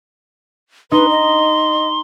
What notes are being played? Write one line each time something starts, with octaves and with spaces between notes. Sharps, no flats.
D#4 B4 C6
D#5